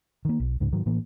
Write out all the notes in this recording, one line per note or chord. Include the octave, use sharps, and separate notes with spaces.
D#3 A#3
B1
C#2 G#2 C#3
G#2 D#3 F#3
A2 E3 A#3